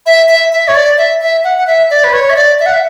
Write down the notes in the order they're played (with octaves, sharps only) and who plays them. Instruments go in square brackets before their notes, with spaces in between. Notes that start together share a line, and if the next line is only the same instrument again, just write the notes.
[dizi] E5
E5
E5
C#5
D5
E5
E5
F#5
F#5
E5
D5
B4
C#5
E5
D5
E5
F#5
E5